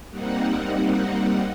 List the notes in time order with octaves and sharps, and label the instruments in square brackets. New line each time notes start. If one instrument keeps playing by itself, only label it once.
[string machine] G3 A#3 C4 D#4 F#5